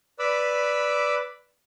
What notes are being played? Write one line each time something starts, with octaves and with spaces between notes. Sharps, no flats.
B4 D5 B5 D6 E6